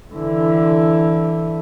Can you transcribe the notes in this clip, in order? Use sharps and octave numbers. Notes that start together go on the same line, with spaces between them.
D3 E3